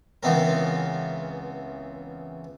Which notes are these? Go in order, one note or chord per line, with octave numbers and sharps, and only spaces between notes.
C#2 E3 B3 C4 A#4